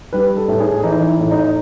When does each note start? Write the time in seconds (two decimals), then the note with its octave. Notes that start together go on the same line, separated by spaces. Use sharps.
0.13 G3 B4
0.37 A4
0.48 A2
0.60 G#4
0.83 E3 D#4
1.07 E4
1.20 A2
1.31 D#4